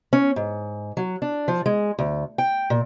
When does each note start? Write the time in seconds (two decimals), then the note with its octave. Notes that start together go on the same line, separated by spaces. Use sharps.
0.13 C#4
0.36 G#2
0.97 F#3
1.22 D4
1.48 F3
1.66 G#3
1.99 D2
2.38 G5
2.70 A#2